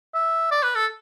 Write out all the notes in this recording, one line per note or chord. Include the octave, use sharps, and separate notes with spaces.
E5
D5
B4
A4